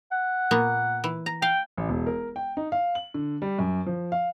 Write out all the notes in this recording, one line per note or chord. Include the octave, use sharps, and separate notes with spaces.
F#5
A#2 A#3 B3
E3
A#5
F5 G5
A1
E1
A#4
G5
D#4
F5
F#7
D3
G3
F#2
F3
F5